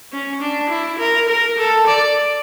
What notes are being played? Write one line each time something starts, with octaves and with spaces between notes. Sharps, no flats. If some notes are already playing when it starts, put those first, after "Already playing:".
C#4
D4
E4
A#4
A#4
A4
D5